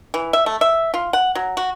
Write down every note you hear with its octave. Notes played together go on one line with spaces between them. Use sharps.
E3
E5
A3
E5
F4
F#5
F#3
F#4